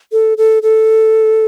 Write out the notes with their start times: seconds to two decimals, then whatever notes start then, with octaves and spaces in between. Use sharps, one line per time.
0.12 A4
0.38 A4
0.63 A4